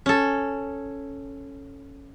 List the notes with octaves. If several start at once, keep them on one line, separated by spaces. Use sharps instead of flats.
C#4 A4